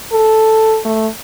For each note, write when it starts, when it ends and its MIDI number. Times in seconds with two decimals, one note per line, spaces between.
0.12 0.79 69
0.85 1.08 57